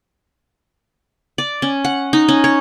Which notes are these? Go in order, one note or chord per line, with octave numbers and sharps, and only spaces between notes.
D5
C#4
F#5
D#4
C#4
C#5